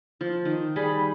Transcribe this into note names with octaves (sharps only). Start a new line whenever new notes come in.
F3
D#3
G3 G#4 G#5 B5